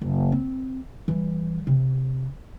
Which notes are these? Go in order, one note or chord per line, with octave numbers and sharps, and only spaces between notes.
F#1
C4
E3 G3
C3